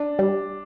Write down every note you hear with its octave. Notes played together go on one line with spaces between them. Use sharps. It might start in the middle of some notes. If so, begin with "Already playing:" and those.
Already playing: D4
G3